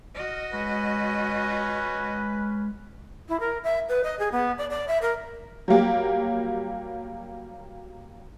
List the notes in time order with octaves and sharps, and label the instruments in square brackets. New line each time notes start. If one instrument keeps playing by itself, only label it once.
[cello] F#4 D#5 [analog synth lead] F6
[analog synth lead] G#3 [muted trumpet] C#4 [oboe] B4
[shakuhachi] E4
A#4
E5
B4
D#5
G#4
B3
D5
D5
E5
A#4
[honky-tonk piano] F#3 G3 A#3 G4